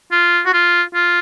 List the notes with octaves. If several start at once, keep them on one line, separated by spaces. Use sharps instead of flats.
F4
F#4
F4
F4